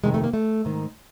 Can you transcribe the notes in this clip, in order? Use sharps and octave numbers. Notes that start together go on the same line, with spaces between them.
F2 C3 D#3 G#3
A3
A#3
A3
G#2 D#3